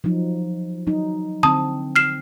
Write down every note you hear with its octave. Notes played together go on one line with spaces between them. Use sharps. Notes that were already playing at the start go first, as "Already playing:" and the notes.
F3 F#3 D#4
F#3 D#4
D3 C4 A5 D#6
F6 C7 E7